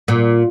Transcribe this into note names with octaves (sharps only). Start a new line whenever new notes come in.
A#2